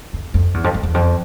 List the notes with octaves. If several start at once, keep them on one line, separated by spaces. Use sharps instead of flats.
F2
F2
E2
F2
F2
E2
F2